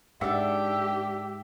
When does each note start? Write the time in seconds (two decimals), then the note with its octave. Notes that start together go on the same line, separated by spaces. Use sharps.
0.21 G#2 D4 G4 E5 F#5